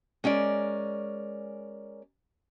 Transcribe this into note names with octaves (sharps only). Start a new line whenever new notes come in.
G#3 C#4 A#4 D5